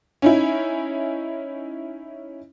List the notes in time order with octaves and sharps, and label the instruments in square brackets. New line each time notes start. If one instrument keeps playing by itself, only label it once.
[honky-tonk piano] C#4 D#4 E4